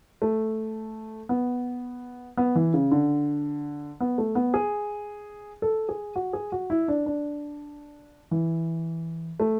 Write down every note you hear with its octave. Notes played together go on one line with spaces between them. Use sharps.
A3
B3
B3
E3
C#3
D3
B3
A3
B3
G#4
A4
G#4
F#4
G#4
F#4
E4
D4
D4
E3
A3